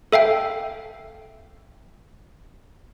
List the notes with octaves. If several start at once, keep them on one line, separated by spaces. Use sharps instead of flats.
A4 E5 F5 G5